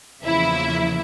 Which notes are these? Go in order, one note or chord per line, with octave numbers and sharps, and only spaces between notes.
E2 C#3 F3 A#3 E4 E5